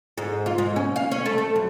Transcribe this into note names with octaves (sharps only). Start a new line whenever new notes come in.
G#2
F4
G#2
C#4
F5
C#4
A3
A3
F#2